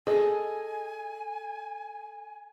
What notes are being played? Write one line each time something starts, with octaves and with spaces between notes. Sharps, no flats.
G#4 A4 D#5 G#5